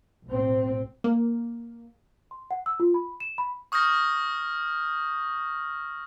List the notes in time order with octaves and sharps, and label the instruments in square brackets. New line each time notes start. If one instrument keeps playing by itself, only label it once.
[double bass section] B1 A2 C4
[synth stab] A#3
[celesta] C6
F#5
E6
F4
B5
E7
B5
[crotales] C#6 D#6 F6 G6 A#6